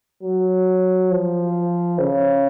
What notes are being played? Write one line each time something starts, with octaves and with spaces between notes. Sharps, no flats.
F#3
F3
C#3